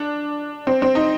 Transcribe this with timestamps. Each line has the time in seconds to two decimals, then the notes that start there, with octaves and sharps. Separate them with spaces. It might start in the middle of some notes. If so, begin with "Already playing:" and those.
Already playing: D4
0.67 C4
0.82 C4
0.95 D#4